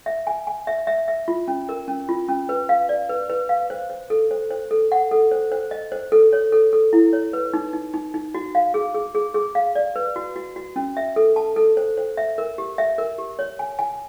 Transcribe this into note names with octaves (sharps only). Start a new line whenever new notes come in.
E5
G#5
G#5
E5
E5
E5
F4
C#4
A#4
C#4
F4
C#4
B4
F5
D5
B4
B4
F5
C5
C5
A4
C5
C5
A4
F#5
A4
C5
C5
D#5
C5
A4
C#5
A4
A4
E4
C#5
B4
D#4
D#4
D#4
D#4
F#4
F5
G#4
G#4
G#4
G#4
F5
D5
B4
F#4
F#4
F#4
C#4
E5
A4
A5
A4
C5
C5
E5
A#4
G4
E5
A#4
G4
C#5
G#5
G#5